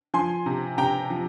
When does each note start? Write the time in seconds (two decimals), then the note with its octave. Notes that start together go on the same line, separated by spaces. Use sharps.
0.14 F3 G#5 C6
0.46 C3
0.78 C3 G5 A#5
1.10 F3